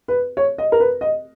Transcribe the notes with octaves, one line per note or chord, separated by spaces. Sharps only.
B4
C#5
D#5
A#4
B4
D#5